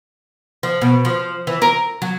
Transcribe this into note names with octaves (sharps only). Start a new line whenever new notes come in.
F3
B2
F3
E3
A#4
F#3